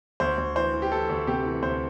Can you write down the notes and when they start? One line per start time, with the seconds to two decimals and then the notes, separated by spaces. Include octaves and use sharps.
0.20 D2 C5
0.38 D2
0.56 E3 C5
0.74 E3
0.82 G4
0.92 E3 A4
1.09 D2
1.27 C3 G4
1.45 E3
1.63 D2 C5